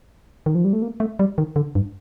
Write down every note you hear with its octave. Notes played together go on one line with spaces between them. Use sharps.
D#3
F3
G3
A3
A#3
A3
G3
D#3
D3
G2